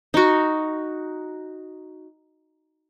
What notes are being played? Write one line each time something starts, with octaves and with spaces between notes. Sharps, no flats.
D#4 F#4